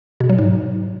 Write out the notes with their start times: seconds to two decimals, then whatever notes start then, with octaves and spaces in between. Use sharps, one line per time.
0.20 B2
0.29 F#3
0.38 G#2